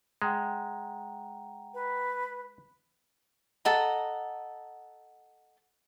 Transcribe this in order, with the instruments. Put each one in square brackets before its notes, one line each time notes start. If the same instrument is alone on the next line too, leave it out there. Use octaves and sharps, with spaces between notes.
[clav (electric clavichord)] G#3 [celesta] F#5 G5 A#5
[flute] B4
[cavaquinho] A4 D#5 F#5 A#5